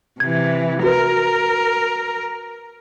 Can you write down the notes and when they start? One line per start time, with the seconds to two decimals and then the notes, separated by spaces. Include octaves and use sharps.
0.20 C3 E3 G#6
0.83 F#4 A#4 B4